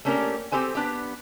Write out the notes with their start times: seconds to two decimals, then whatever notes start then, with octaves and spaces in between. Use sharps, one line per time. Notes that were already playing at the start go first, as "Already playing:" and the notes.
0.05 A3 A#3 C#4 D4 G4 A#4
0.52 C4 G4 A4 C5 G#5
0.75 B3 D4 G4